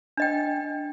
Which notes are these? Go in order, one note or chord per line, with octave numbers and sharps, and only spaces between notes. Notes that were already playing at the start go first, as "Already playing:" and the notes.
D4 D#5 G5